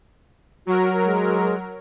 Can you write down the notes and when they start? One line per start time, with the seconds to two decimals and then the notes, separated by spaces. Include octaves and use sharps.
0.67 F#3 F#4 A#4
1.04 G#3